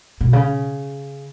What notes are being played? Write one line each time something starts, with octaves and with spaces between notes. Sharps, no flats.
B2
C#3